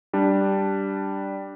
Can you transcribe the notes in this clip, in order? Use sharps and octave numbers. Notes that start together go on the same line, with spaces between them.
G3 D4